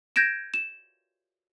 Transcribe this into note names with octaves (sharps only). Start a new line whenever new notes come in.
G6 G#6 A#6 D7 E7
E7